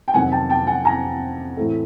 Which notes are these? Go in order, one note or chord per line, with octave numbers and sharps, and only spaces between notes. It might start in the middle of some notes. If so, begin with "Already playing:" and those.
G5
F2 C3 D#3 F#3 F#5 G#5
G5 A5
G5 A5
F#5 G#5
G#5 A#5
A2 E3 A3 C4